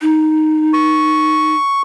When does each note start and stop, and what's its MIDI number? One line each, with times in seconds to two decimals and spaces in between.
0.02 1.55 63
0.73 1.82 85